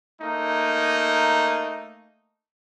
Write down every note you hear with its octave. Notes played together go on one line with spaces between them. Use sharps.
A3 A#3 D#4